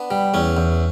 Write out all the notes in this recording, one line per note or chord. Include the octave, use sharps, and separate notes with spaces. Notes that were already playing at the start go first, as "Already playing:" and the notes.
Already playing: B3 D4
G3
E2 C#4
E2